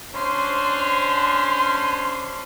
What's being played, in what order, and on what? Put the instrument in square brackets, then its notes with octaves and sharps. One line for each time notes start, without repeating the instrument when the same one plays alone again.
[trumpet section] C#4 D4 C5 [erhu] C6